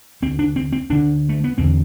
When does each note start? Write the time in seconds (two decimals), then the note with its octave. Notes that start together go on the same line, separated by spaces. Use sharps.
0.22 D2 D3 C4
0.39 D4
0.56 C4
0.73 C4
0.90 D2 D3 D4
1.29 A3
1.44 B3
1.58 E2 D3 C4